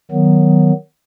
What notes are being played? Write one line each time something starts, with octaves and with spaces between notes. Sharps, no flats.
D#3 F#3 B3